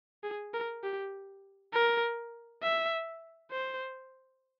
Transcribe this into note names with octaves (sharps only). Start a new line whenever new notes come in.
G#4
A#4
G4
A#4
E5
C5